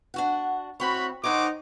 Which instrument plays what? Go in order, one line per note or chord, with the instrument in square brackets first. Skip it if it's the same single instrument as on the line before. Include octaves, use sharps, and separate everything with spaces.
[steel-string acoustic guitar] D4 F#4 F#5
[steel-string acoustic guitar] A2 C4 C#5 [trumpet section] F#4 B5
[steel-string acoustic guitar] D#3 C5 C#5 [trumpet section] D#4 F#5 D6